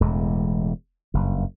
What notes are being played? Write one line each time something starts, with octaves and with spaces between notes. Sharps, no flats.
E1 E2 A2 G#3
F#1 G2